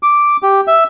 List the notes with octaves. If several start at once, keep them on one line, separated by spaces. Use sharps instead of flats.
D6
G4
E5